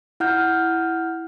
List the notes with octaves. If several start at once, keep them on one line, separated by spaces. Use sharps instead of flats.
E4 F#5 F6 G6